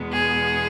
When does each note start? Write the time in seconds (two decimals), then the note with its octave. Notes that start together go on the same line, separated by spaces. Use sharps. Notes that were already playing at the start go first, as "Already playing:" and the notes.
Already playing: E2 B2 G#3 B3
0.13 G#4